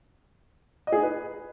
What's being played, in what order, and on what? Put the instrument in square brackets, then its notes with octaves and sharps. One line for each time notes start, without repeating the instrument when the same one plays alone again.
[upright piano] D#5
G#4
D#4
B4